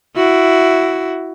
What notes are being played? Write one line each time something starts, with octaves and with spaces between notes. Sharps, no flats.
E4 F#4